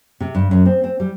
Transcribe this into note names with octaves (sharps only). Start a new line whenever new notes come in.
C3
G2
F#2
C4
C4
G3